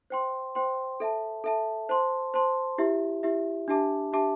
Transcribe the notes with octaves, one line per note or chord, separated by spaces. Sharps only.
C5 G5 C6
C5 G5 C6
A4 E5 A5
A4 E5 A5
C5 A5 C6
C5 A5 C6
E4 G4 E5
E4 G4 E5
D4 G4 E5 A5 D6
D4 G4 E5 A5 D6